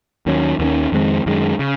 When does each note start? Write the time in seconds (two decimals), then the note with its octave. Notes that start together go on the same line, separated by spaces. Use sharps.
0.26 D#2 D#3 F#3 C#4
0.59 D#2 D#3 F#3 C#4
0.92 F2 D#3 G#3 C4
1.26 F#2 D#3 G#3
1.59 C#3